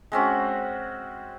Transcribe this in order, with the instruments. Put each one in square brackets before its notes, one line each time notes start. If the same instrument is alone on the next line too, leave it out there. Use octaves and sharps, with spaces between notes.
[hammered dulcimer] G#3 C4 C#4 F#4